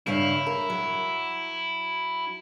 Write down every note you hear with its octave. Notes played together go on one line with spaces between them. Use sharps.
G2 C#3 E4 F5
A#4
F#3